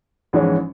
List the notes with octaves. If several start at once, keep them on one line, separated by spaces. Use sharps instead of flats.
A#1 G#2 E3 G#3 C#4